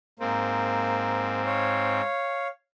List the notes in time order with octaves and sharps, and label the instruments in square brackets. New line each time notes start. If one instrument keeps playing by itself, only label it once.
[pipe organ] G#2 C4 [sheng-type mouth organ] A#3
[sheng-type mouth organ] C#5 F5